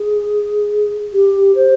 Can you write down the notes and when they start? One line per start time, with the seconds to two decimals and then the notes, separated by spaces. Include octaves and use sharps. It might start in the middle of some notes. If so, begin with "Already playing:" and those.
Already playing: G#4
1.13 G4
1.55 C5